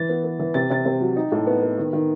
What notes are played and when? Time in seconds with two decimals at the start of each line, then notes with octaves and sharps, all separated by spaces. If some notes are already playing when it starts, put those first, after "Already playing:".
Already playing: E3 A6
0.09 B3
0.24 B3
0.39 E3
0.54 C3 A6
0.70 C3 A6
0.85 C3
1.00 F#3
1.16 D#4
1.32 A2
1.47 B3
1.63 B3
1.78 D#3
1.93 D#3